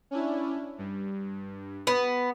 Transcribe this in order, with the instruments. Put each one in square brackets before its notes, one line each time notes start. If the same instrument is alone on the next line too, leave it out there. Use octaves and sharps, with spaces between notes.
[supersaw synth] C#4 D4 E4
G2
[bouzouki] B3